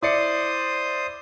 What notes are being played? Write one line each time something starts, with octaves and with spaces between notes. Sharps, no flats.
E4 C5 D5 D#6 C#7